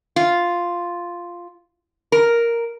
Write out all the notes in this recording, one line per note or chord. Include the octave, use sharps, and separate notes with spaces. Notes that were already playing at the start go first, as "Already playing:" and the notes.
F4
A#4